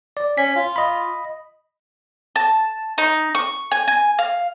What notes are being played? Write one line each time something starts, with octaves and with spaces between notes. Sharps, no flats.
D5
C#4 B6
F4
D#5 B5
A5
D#4
C#6
G#5
G#5
F5